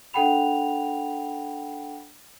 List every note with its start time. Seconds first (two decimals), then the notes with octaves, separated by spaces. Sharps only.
0.13 D4 A4 F#5 G5 B5 F7